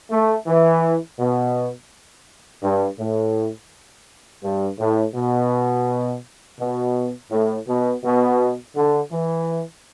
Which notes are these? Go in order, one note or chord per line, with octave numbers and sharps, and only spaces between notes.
A3
E3
B2
G2
A2
G2
A2
B2
B2
A2
B2
B2
D3
E3